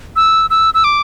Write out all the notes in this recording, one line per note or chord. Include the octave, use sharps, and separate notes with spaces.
E6
E6
E6
D6